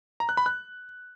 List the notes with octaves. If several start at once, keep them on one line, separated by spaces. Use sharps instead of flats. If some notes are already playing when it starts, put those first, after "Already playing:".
A#5
F#6
B5
F#6